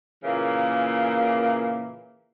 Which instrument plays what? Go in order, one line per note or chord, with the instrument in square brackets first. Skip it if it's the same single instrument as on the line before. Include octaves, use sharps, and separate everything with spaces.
[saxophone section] A#2 C#3 E3 A#3